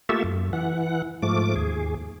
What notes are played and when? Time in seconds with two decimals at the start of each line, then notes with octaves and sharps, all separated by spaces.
0.09 A3 A#3 F4 G4 A4 E5
0.24 F#2
0.53 E3 F#5
1.22 G#2 F3 A3 D6
1.56 D#2 G#4